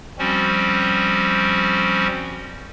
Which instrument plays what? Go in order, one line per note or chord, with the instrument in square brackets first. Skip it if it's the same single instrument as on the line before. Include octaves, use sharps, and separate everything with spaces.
[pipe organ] F3 G3 C4 C#4 F#4